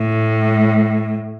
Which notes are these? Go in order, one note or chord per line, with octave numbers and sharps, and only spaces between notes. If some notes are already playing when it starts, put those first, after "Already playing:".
Already playing: A2